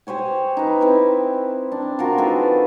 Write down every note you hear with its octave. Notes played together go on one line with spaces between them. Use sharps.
G4 C5 C#5 G#5
D#4 B4
C4 E4 E5
D4
F4 F#4 A#4
D#3 G#4 A4 B4